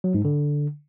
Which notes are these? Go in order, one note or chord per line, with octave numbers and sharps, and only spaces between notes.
F#3
G#2
D3